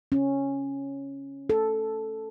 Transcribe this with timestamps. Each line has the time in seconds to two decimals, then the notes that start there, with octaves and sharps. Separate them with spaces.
0.12 C#4
1.50 A4